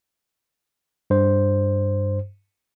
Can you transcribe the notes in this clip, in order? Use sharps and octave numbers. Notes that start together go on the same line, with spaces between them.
G2 C5